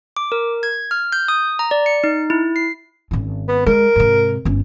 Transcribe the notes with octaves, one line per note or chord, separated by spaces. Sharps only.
D6
A#4
G#6
F6
G6
D#6
A#5
D5
C#7
D#4
E4
C7
G#1 C#4
B3
G#3 A#4
G#2 C3
G1 C#4